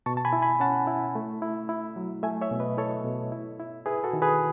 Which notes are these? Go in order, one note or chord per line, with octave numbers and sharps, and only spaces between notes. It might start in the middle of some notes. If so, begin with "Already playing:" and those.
B2 A5 C#6
A5
G#5 B5
E4
G#5 B5
C#4 F#5 A5
E4
A3
E4
E4
F#3
A3 E5 G#5
C#5 E5
B2
B4 D#5
E4 A4 C#5
B2
E4
E4
E4 G#4 B4
F#4 A4
D#3
G#4 B4